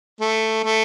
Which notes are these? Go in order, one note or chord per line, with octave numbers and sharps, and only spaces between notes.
A3
A3